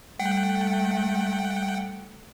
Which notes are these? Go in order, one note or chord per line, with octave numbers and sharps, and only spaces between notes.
G3 A3 F#5 G5